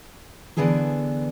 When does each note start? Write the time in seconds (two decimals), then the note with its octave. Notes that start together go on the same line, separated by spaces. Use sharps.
0.57 D3 E3 B3 D4 G#4 A4